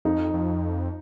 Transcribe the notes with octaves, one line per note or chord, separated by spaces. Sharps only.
F2 D#4
F2